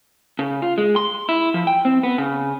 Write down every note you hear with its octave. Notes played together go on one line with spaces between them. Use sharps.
C#3
F4
G#3
C6
E4
F3
G5
C4
B3
C#3